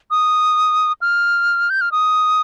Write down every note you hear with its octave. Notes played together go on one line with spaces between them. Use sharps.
D#6
F6
G6
F6
D#6